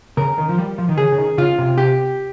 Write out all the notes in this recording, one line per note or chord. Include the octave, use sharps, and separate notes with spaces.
C#3 A#4
D#3
F3
G3
F3
D#3
C#3 G#4
C#3
D#3
C#3 F4
C3
G4